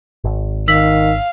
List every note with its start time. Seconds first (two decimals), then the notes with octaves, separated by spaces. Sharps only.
0.24 G#1
0.68 D#3 F5 E6 B6 F#7